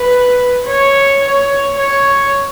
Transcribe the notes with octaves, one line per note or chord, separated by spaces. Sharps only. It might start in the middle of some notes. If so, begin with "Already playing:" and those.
Already playing: B4
C#5
C#5
C#5